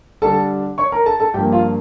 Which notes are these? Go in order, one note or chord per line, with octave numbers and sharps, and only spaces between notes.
D3 G3 D4 A4 A5
C#5 C#6
A#4 A#5
A4 A5
A4 A5
G2 F3 A#3 G4 G5
F4 F5